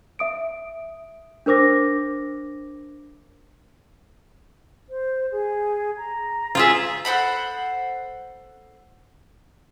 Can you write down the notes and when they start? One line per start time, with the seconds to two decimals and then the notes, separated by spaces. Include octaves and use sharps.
0.19 E5 D#6 D7
1.46 D4 A#4 C5 D6 A#6
4.89 C5
5.31 G#4
5.97 A#5
6.55 F4 G#4 E5
7.05 A4 C5 F#5 B5